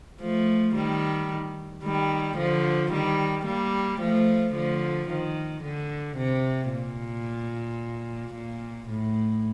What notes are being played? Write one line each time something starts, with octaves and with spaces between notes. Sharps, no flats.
F3 A3
D#3 G3
D#3 G3
D3 F3
D#3 G3
G3 A#3
F3 A3
D3 F3
D#3
D3
C3
A#2
A#2
A2